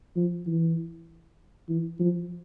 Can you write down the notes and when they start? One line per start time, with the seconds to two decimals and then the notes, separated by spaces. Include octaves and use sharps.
0.16 F3
0.47 E3
1.69 E3
2.00 F3